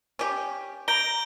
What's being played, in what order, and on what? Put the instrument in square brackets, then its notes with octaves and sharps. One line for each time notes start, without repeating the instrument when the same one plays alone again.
[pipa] C#4 G4
[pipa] A#5 [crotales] G6 D7 G7